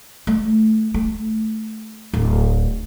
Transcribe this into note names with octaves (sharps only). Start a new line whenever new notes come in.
A3
A3
D1